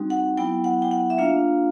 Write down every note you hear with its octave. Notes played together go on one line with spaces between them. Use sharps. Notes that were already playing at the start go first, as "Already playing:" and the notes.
Already playing: G3 C4 D#4 F#4
F#5
F#3 B3 E4 G5
F#5
G5
F#5
E5
A#3 D4 F4 F5